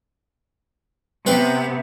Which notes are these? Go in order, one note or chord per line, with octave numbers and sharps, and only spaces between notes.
C3 B3 C4 B4 C5